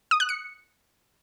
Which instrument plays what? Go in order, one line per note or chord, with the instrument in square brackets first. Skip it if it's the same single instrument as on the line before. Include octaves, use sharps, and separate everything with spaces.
[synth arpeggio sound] D#6
F#6
C#7